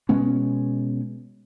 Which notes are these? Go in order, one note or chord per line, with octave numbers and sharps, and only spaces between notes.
B2 G#3 B3 C#4